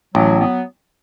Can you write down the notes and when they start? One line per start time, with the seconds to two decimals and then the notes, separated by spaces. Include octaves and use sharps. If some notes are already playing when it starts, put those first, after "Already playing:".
0.15 A1 F#3
0.40 F#3 B3